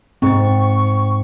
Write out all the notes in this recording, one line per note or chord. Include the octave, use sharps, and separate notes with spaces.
G#2 C4 C#6 A6